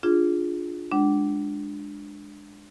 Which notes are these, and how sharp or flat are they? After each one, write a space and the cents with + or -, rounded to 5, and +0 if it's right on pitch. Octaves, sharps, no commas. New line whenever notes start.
D4 +0 F4 +0 G#4 +0
G#3 -10 D4 +0 F#5 +40